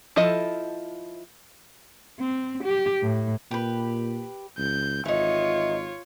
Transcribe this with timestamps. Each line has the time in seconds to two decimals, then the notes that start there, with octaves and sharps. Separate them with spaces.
0.16 F3 E4 A4 D#5
2.20 C4
2.64 G4
3.02 A2
3.51 A#2 G4 B4
4.58 C#2 G6
5.06 G#1 E3 D#4 F4 C#5